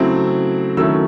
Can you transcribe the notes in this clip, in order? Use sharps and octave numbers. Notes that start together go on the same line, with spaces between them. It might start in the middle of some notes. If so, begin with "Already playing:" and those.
Already playing: C#3 F#3 A3 C4 E4
D#3 F#3 A3 C#4 E4 E6